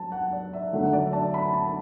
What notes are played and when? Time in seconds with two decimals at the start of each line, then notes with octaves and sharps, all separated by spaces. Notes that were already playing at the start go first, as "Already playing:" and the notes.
Already playing: F#3 A5
0.12 F#5
0.32 D5
0.53 E5
0.73 D3 F#3 A3 F#5
0.83 F#5
0.93 D5
1.04 E5
1.13 A5
1.34 B5
1.54 A5